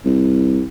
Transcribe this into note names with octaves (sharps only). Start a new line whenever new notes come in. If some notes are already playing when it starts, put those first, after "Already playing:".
C2